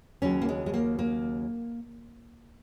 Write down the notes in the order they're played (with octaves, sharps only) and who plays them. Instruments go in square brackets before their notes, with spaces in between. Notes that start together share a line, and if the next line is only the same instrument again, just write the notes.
[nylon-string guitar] D#2 C#3 F#3 C#4
A#3
G#3
G#3
A#3
A#3